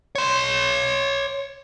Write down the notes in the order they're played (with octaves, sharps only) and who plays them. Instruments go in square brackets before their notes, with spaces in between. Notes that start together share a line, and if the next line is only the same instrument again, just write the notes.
[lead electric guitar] C#5 C6